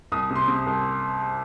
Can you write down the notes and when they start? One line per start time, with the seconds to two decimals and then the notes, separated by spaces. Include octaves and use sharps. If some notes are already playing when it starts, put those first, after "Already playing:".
0.12 C2 D#6
0.30 C3
0.36 C6
0.48 C3
0.66 C2